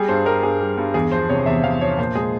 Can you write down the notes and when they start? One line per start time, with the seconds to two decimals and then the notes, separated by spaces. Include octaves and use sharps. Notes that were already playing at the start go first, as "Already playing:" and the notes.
Already playing: G3 G#4
0.08 G2 C5
0.25 G3 A#4
0.43 G2 G#4
0.60 G3
0.78 G2
0.94 E2 G#4
1.12 F3 C5
1.29 C3 C#5
1.46 E2 E5
1.64 E2 F5
1.81 F3 C#5
1.98 A#2 C5
2.15 G#3 G#4